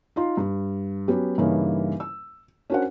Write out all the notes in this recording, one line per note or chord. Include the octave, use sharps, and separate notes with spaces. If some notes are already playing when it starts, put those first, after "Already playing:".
D#4 F4 C6
G2
F#3 B3 C#4 G4
G2 C#3 E3 A#3 C#4 D#4
E6
C#4 D4 F#4 A#4 C5 F#5